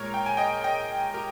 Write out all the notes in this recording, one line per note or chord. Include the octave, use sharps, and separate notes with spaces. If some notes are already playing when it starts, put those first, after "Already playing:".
Already playing: A#2 G#3 A#4 C#5
G5
G#5
D#5 G5
D#5 G5
G4 A#4